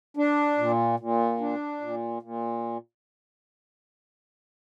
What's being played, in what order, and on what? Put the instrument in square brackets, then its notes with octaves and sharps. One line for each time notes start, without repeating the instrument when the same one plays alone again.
[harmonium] D4
A#2
A#2
D4
A#2
A#2